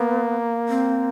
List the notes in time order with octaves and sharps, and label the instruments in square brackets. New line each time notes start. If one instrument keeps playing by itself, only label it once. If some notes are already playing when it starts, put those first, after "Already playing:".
Already playing: [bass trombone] A#3 [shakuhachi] B3
[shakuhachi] C4